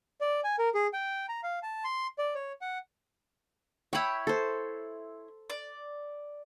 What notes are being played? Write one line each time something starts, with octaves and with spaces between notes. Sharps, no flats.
D5
G#5
A#4
G#4
G5
A#5
F5
A5
C6
D5
C#5
F#5
E4 C#5 G5 B5
A4 C5
D5